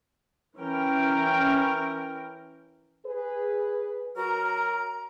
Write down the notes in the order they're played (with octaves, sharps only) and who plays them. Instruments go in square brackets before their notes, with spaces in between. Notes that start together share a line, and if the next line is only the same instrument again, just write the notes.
[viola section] E3 C#4 A#4 G5
[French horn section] G#4 B4
[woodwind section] F#3 F#4 A#4 [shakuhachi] A#5